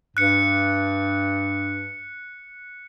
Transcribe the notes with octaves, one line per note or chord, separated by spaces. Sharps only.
G2 F#6 C#7